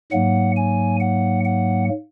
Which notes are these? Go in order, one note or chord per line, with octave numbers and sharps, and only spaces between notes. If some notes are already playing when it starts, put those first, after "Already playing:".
G#2 F#3 A#3 F#5
G#5
F#5
F#5